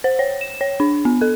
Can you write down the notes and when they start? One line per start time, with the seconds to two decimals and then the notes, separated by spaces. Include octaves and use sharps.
0.04 C5
0.19 C#5
0.41 E7
0.61 C#5
0.80 D4
1.05 B3
1.21 A4